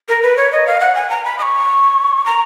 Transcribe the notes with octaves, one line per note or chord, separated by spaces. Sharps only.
A#4
B4
C#5
D#5
F5
F#5
G#5
A#5
B5
D#6
C#6
A#5